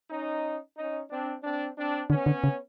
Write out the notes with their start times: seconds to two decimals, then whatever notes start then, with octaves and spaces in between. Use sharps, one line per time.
0.10 C#4 D#4
0.77 C#4 D#4
1.10 C4 D4
1.44 C4 D4
1.77 C4 D4
2.10 D3 B3 C#4
2.26 D3
2.44 C#3